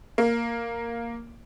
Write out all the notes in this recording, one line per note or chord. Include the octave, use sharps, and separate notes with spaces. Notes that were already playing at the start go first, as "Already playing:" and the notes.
A#3